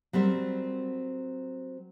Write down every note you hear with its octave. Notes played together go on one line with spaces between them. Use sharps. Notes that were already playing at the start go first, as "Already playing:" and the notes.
F#3 G3 C4 A#4